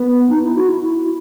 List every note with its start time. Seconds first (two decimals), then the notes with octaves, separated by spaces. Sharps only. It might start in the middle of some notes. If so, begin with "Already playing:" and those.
Already playing: B3
0.29 D#4
0.42 E4
0.56 F#4
0.70 E4
0.83 E4